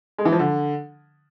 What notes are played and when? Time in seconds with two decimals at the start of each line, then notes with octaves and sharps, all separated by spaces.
0.18 G#3
0.25 E3
0.32 F3
0.39 D3